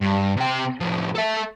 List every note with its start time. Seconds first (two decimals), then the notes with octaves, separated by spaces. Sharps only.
0.02 G2
0.37 C3 G5
0.80 A2 F3
1.15 A4 E5